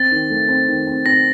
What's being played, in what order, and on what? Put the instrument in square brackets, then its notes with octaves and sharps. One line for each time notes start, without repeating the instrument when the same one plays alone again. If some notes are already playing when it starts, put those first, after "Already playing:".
Already playing: [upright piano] C4 [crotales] A6
[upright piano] D#3
A3
C4
D#3
C4
[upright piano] C4 [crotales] A#6